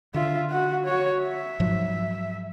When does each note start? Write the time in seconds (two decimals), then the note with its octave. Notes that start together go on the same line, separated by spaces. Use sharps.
0.14 D3 F4 E5
0.50 F#4 F#5
0.84 F#4 C#5
1.21 E5
1.60 G#2 F3 F#3